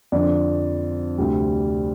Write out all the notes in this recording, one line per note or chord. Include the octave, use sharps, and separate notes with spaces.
F2 D3 F3 D5
D2 C3 G3